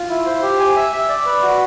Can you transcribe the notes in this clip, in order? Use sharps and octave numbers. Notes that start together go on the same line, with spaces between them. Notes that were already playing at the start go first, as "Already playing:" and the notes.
Already playing: F4
E4
C5
G4
G#5
E5
E5
D5
B4
F#4